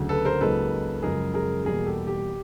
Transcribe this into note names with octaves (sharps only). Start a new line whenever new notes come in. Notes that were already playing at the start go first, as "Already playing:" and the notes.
Already playing: D2 C#3 F#3
A4 B4
A#4 C5
C#2 C#3 F#3 A#3 D#4 A4 B4
F#2 C#3 F3 G#3 G#4 A#4
G#4 A#4
E2 B2 G3 A#3 G#4 A#4
G4 A4
G4